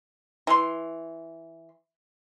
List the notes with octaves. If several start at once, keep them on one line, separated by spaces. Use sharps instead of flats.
E3 C6